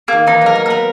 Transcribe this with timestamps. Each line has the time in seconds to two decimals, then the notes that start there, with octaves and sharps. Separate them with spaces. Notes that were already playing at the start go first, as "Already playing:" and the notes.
0.08 D#3 A#3
0.27 E3 D#4
0.41 F#3 A#4
0.55 A#3
0.66 B3 A#4